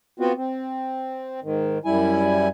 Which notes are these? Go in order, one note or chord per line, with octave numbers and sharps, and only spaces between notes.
B3 C4 F4 F#4
C4
G#2 D#3
F#2 G3 E4 G#5